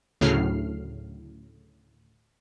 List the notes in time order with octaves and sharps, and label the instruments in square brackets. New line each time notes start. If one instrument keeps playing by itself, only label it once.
[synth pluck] D2 A2 C#3 F#3 F6 C7